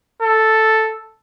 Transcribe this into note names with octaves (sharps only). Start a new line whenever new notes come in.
A4